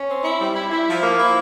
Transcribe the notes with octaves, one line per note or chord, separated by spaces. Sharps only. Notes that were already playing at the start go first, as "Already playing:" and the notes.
Already playing: C#4
C4
E4
G3
E4
E4
F3
A#3
E4